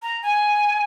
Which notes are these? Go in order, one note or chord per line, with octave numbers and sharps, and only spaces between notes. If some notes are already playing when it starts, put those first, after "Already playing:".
A#5
G#5